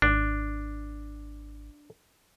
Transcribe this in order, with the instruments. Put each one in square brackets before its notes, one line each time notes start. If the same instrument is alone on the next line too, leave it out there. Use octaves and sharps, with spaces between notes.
[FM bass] G#1 [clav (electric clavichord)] D4